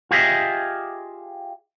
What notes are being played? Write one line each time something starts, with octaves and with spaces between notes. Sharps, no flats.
F4 G4 G#4 D#5 E5